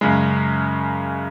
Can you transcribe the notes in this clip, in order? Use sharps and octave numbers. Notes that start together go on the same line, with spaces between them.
F#2 C#3 G#3